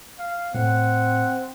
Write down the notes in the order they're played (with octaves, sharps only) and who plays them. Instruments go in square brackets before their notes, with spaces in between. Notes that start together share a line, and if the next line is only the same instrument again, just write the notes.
[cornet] F5
[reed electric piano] A2 [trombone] C4 [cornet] F#5